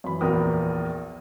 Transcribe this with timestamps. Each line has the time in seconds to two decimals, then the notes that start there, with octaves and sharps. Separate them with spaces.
0.04 F#2 E3 B5
0.21 A#1 E2 F#4 A#4 G5 D#6